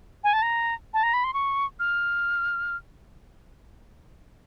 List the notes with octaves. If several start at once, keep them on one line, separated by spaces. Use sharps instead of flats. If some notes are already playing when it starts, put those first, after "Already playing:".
G#5
A5
A#5
A5
A#5
B5
C6
C#6
F6